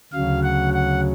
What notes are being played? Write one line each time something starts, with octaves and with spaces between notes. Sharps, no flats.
D2 C#3 F#3 F5
F#5
F#5